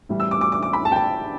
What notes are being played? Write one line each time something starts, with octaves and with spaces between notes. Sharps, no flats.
A2 E3 G3
E6
D6
D6
D6
D6
B5
A5
G5
A5